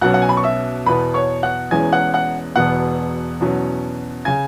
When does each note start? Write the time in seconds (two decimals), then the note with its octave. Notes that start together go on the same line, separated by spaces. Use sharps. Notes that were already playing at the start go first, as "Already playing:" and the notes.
0.01 B1 B2 F#3 C#4 F#5 F#6
0.14 F#5
0.22 G#5
0.29 B5
0.37 C#6
0.44 E5 E6
0.86 E2 B2 B3 B4 B5
1.14 C#5 C#6
1.43 F#5 F#6
1.71 E1 E2 E3 G#3 C#4 G#5 G#6
1.93 F#5 F#6
2.14 F#5 F#6
2.56 E1 E2 B2 B3 F#5 F#6
3.41 E2 B2 F#3 C#4
4.25 C#3 G#5 G#6